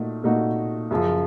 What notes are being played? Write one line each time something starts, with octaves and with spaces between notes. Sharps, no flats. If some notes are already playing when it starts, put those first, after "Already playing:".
Already playing: A#2 A3 D#4 F#4
A#2 A3 D#4 F#4
F#2 C#3 F3